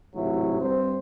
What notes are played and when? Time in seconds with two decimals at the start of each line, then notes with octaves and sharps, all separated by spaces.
0.14 A1 G#2 C3 F#3 E4
0.60 G2 C4 C5